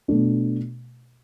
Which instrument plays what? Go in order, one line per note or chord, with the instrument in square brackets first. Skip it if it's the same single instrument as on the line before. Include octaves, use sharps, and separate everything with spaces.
[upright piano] B2 A3 D4